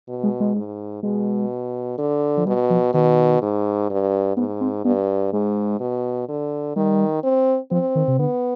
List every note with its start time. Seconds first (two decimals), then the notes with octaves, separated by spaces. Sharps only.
0.09 B2
0.23 G#3
0.40 G#3
0.56 G#2
1.03 B2 G#3
1.98 D3
2.37 F3
2.46 B2 G3
2.70 F3
2.94 B2 D#3
3.42 G#2
3.90 G2
4.37 G#2 B3
4.61 C4
4.84 G2 B3
5.33 G#2 G#3
5.80 B2
6.28 D3
6.76 D#3 G3
7.23 C4
7.71 F3 C4
7.95 D#3
8.08 C3
8.19 D3 B3